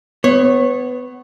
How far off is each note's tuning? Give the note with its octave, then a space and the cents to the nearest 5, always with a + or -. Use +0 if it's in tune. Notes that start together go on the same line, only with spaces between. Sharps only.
B3 +20 C#5 -20